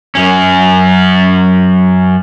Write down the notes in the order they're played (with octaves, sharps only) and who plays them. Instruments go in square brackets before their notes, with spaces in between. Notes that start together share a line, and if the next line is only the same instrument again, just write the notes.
[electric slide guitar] F#2 C#4